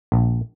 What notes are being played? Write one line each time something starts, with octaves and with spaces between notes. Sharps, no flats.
A#1